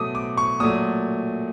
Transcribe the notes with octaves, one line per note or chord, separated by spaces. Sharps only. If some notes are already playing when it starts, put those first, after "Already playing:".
Already playing: B2 F#3 A3 D6 D#6
D6
C#6
A#2 F#3 A3 D#6